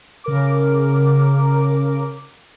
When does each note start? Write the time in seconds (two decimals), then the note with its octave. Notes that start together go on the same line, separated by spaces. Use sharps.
0.24 C#3 A#4 D6